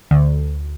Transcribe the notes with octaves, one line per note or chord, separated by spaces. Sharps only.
D2